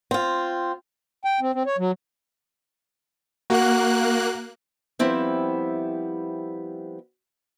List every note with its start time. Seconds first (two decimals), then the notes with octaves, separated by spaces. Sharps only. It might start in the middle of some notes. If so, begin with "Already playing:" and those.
0.11 C4 F4
1.25 G5
1.41 C4
1.54 C4
1.66 C#5
1.78 F#3
3.50 A#3 F#4 F#6
4.99 F3 G3 B3 C4 E4 E5